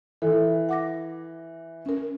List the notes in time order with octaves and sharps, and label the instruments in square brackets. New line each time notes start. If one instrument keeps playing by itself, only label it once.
[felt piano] E3 [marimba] A4
[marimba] F#5 D6 A#6
C#4 A#4